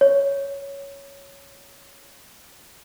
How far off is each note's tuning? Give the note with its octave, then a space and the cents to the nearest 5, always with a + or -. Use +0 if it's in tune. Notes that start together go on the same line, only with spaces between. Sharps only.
C#5 +5